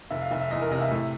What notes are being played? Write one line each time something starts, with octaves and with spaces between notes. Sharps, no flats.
F1 E5
F5
F1 E5
E5
E2 D#5
A#4
C3 D#5
E5
A2